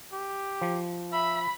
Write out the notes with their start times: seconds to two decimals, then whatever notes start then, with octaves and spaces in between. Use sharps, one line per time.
0.13 G4
0.61 F3
1.12 E5 B5